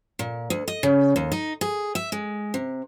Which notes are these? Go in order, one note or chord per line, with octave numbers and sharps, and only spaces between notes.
A#2
D2
D#5
C#3
D#2
D#4
G#4
E5
G#3
C3